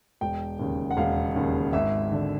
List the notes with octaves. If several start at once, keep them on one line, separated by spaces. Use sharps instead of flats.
E1 G5
D#2 C#3
F#5
E1 F5
D#2 C#3
G#1 E5
D3